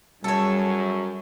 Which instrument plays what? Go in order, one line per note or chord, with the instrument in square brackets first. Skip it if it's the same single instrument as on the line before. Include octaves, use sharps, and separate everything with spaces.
[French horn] F#2 [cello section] G3 G#4 [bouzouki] A4 C#5